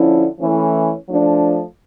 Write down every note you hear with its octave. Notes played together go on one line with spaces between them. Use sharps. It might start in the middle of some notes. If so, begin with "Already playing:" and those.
Already playing: D3 F3 C#4 E4
E3 A3 C#4 E4
F3 A3 D4